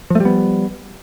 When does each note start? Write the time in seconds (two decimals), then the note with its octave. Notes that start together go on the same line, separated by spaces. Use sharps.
0.10 F3
0.15 A3
0.20 G3
0.25 B3